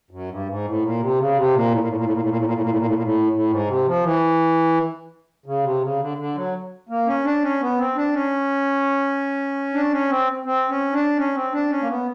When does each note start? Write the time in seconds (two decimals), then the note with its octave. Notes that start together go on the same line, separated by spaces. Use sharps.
0.11 F#2
0.29 G2
0.47 G#2
0.65 A2
0.82 A#2
1.00 C3
1.19 C#3
1.37 C3
1.54 A#2
1.71 A2
1.80 A#2
1.88 A2
1.96 A#2
2.04 A2
2.12 A#2
2.21 A2
2.29 A#2
2.37 A2
2.45 A#2
2.54 A2
2.62 A#2
2.69 A2
2.78 A#2
2.86 A2
2.94 A#2
3.03 A2
3.33 A2
3.50 G#2
3.68 C3
3.86 F3
4.04 E3
5.46 C#3
5.64 C3
5.82 C#3
6.00 D3
6.18 D3
6.36 F#3
6.89 A#3
7.07 C#4
7.24 D4
7.43 C#4
7.60 B3
7.78 C4
7.96 D4
8.14 C#4
9.74 D4
9.92 C#4
10.10 C4
10.45 C4
10.69 C#4
10.93 D4
11.17 C#4
11.35 C4
11.52 D4
11.70 C#4
11.82 A#3
11.88 B3